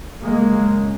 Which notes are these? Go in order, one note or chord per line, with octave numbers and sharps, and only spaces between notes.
F#2 C#3 G#3 A#3